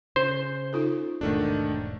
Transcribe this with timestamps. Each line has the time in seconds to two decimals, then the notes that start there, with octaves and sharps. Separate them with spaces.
0.16 C#3 C5
0.73 D#4 F4 A4
1.21 E1 G#2 D#3 A3 D4